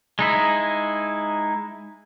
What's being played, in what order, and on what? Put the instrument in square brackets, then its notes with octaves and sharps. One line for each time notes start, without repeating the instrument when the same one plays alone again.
[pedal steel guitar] G#3 D#4 E4